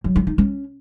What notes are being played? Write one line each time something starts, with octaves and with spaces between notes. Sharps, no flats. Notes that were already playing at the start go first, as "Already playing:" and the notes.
F#3
E4
D#4
C#4